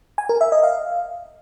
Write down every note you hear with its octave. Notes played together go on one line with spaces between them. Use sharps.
G#5
A#4
E5
D#5
F5